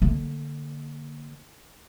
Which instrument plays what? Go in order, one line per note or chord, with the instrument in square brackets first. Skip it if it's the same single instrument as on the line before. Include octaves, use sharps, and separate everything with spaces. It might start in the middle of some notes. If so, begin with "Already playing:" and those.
[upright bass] D3 A#3